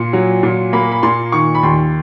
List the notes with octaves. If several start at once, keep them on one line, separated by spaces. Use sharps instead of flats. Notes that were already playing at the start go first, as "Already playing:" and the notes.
Already playing: A#2 C6
F#3
A#2
A#3 B5
B5
A#2 C6
D#3 C#6
B5
D#2 C6